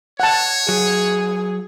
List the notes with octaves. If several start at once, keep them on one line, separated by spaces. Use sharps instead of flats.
C#5 F#5 A5
F#3 G#4